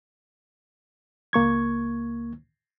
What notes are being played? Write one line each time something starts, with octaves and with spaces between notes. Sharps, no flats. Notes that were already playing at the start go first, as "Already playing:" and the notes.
C#2 A#3 C#6 G#6